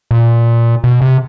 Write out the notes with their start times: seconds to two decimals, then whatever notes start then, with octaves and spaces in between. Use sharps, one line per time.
0.11 A#2
0.84 B2
1.01 C3